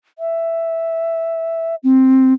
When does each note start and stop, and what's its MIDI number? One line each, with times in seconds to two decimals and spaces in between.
0.19 1.75 76
1.83 2.33 60